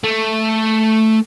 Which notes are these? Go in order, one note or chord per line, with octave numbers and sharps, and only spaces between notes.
A3